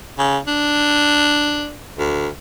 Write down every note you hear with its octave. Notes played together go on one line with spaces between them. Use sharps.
C#3
D4
D2